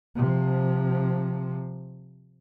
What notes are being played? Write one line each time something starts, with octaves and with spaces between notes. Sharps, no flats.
C3 F3